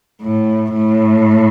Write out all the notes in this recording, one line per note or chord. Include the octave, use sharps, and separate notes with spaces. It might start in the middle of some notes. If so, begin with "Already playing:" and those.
A2
A2